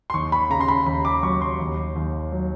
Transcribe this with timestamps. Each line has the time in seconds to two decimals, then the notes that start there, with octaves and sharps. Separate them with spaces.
0.10 C6
0.14 D#2 C#6
0.32 B5
0.50 C#3 A#5
0.61 C6
0.68 B5
0.86 D#2 B5
1.05 D6
1.23 F#3 C#6
1.42 C6
1.60 D#2
1.96 D#2
2.32 F#3